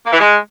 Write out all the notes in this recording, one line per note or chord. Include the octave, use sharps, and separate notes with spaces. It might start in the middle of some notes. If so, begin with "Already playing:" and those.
A#3
E3
G#3